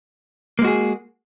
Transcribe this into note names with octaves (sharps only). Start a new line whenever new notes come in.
G#3 A#3 F#4 G#4